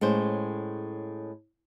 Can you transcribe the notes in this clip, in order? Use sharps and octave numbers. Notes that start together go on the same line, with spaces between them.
A2 G#3 C#4 C5